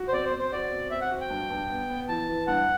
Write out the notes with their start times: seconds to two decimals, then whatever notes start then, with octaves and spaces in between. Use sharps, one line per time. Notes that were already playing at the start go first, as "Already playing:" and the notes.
Already playing: F#4
0.08 C5
0.13 C4 D5
0.25 C5
0.32 C4
0.39 C5
0.52 F#4 D5
0.72 C4
0.91 C4 E5
1.01 F#5
1.11 F#4
1.21 G5
1.30 G2
1.50 G2
1.70 B3
1.90 B3
2.08 E3 A5
2.29 E3
2.47 G2 F#5